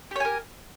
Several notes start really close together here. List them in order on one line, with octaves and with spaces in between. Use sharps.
G4 C#5 G#5 A#4